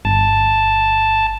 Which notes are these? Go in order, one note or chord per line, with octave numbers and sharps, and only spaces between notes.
G1 A5